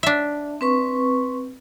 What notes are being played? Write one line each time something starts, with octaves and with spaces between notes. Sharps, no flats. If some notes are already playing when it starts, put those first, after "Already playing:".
D4 E5
C4 B4 C#6